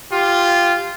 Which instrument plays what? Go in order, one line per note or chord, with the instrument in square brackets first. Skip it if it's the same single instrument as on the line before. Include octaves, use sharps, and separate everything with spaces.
[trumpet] F4 [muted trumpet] G4